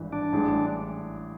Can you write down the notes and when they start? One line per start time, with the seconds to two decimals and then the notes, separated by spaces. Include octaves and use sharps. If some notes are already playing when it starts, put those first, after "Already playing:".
Already playing: G#1 G2 E3
0.13 D4
0.33 A1 G2 E3 G#3